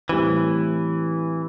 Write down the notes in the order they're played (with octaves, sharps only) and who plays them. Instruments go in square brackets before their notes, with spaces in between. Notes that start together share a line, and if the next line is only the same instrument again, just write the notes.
[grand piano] A2 G3 C4 [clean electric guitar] E3